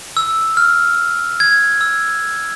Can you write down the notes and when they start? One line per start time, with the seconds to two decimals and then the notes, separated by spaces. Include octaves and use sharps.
0.17 E6
0.57 F6
1.40 G#6
1.81 E6